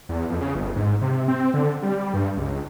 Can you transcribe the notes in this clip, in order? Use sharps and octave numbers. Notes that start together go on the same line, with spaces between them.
E2
F2
C#3
G1
G#2
C3
C4
D3
G3
G2
C#2